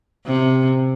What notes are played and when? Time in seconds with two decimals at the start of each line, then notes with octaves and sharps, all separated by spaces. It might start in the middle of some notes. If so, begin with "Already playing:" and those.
0.26 C3